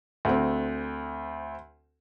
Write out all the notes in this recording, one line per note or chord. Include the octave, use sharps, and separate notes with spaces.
D2 C4